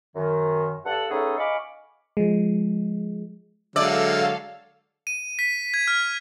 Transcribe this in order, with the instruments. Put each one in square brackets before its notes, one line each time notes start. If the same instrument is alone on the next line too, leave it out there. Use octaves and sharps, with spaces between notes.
[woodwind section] F#2 D#3
G2 A4 F#5
A3 B3 C#4 D#4 G#4 A4
D#5 F5 G#5 B5 C#6 D6
[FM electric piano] F3 G#3
[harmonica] D3 F#3 G#3 [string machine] A4 F5 [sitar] D5 [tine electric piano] E5 E6
[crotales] D#7
B6
G#6
F6